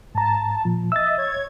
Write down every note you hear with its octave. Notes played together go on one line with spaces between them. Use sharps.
G#2 A5 A#5
A#2 F3
D#5 E5 E6 A6
C#5 G#6